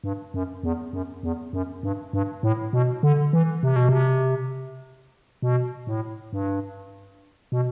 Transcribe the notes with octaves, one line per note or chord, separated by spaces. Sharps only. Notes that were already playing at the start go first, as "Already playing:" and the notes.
G2
F#2
E2
F#2
E2
F#2
G2
G2
A2
B2
D3
E3
C3
B2
C3
B2
A2
G2
B2